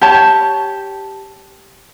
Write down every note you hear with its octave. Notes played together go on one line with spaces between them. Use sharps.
G4 C#5 A5